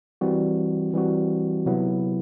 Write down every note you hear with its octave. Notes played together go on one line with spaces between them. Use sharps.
E3 G3 C4 F#4
E3 G3 C4 F#4
C3 F#3 B3 E4